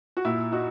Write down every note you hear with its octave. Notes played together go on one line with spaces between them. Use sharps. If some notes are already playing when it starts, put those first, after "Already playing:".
F#4
A#2 E4
D#4 F#4